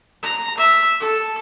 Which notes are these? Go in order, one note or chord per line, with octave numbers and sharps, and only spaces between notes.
A#5
E5
A4